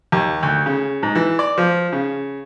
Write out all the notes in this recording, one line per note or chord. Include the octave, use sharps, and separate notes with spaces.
D#2
D2
C#3
G#2
E3
D5
F3
C#3